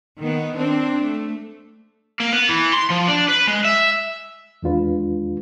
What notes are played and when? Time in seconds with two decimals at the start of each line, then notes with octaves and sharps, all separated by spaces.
0.19 D#3 B3
0.57 C4 D4
1.04 A3
2.20 A#3
2.33 B3
2.49 E3
2.73 C6
2.90 F3
3.08 D4
3.28 B4
3.47 G#3
3.65 E5
4.63 E2 D#3 G#3 D4 F4 B4